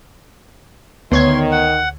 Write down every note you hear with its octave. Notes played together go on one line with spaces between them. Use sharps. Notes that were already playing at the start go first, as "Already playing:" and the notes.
D2 D#3 B3 C#5 C6 G#6
F#5